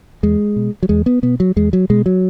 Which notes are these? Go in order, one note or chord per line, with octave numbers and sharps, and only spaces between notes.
E2 G#3
B2
F#3
E2 G#3
B3
B2 B3
F#3
E2 G#3
F#3
B2 G#3
F#3